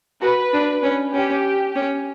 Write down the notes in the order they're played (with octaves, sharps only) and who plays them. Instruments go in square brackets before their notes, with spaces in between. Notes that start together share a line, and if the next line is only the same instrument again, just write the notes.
[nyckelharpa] F#4 [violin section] B4
[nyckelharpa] D4
C#4
[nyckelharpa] C#4 [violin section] G4
[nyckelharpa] C#4